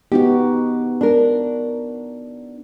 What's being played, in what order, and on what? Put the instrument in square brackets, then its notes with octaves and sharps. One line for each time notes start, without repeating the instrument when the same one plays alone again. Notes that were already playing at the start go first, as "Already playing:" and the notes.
[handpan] B3 D#4 F#4 [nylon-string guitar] G4
[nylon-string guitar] D4 A#4